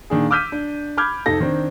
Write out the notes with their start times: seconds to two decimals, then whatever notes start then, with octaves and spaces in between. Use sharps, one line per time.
0.10 A#2 D#3 D4 G#4
0.31 D6 E6 F6 G6 B6 D#7
0.52 D4
0.97 B5 D6 F6 G6 G#6
1.26 F2 C3 D#4 A4 A#6
1.40 D#3 C4 D4